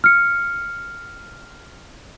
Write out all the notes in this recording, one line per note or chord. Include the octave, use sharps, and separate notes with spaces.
F6 C#7